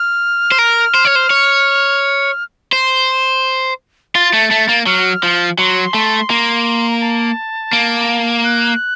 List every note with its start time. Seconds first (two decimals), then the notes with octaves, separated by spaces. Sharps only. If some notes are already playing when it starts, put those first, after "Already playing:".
Already playing: F6
0.52 C5
0.59 A#4
0.94 C5
1.05 C#5
1.15 C5
1.30 C#5
2.73 C5
4.15 F4 A6
4.33 A3
4.51 A3
4.69 A#3
4.86 F#3 F6
5.23 F3
5.58 F#3 C6
5.94 A3
6.30 A#3
6.91 A#5
7.02 A5
7.73 A#3
8.45 F#6